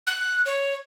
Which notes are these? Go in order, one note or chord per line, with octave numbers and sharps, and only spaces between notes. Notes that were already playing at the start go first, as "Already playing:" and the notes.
F#6
C#5